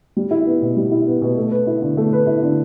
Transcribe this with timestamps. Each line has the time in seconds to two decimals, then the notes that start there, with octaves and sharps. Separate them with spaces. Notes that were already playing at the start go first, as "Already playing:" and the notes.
0.17 G3
0.31 E4
0.46 B3
0.62 B2
0.77 G3
0.91 E4
1.07 B3
1.22 B2
1.37 A3
1.51 B4
1.67 E4
1.82 D3
1.97 A3
2.13 B4
2.27 E4
2.43 D3